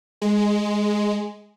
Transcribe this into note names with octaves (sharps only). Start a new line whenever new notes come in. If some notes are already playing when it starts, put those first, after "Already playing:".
G#3